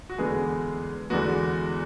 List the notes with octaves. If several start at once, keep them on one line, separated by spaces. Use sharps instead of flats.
F#4
E2 D3 G#3 B3 G#4
E2 D3 G#3 B3 F#4